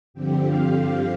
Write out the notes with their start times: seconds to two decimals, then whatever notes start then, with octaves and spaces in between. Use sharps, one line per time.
0.14 G2 D3 F3 C4 G4
0.45 F5